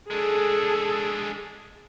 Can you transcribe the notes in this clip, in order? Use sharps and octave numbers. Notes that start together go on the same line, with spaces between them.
G#3 D4 G#4 A4